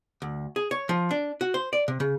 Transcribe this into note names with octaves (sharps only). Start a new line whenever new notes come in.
D2
G#4
C#5
F3
D4
F#4
C5
D5
C3
C#3